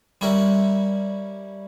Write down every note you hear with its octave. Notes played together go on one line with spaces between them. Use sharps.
G3 C#4 E4 A#4